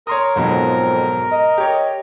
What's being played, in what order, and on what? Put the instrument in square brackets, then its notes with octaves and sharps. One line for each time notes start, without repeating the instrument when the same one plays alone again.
[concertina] A#4 [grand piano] C#5 C6 D#6
[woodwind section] F2 [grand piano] G#2 B2 F#3
[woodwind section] D#5
[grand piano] G4 C#5